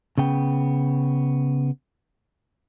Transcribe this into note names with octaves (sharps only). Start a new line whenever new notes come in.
C#3 B3 G5